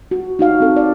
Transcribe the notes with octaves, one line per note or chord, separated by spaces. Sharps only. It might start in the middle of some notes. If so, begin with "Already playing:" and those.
F#4
D#4 F#4 F5
C4 A4
D5